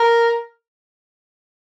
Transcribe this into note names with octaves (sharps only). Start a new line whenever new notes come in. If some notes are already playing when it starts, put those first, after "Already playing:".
Already playing: A#4